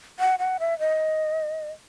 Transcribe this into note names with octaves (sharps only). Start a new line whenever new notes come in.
F#5
F#5
E5
D#5